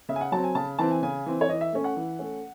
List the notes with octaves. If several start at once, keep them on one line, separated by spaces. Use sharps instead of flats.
C#3 E5
G#5
F#5
F#3 C4 A5
G#5
C#3 A5
E3 C4 A5
G#5
C#3 G#5
E3 C4
C#5
E3 D#5
E5
A3 C#4
F#5
E3
A3 C#4